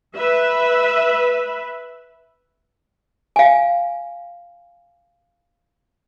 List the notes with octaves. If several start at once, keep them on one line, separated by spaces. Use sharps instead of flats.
B4 E5
F5 G#5